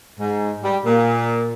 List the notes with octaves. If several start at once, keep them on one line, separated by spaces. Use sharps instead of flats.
G#2
G3
A#2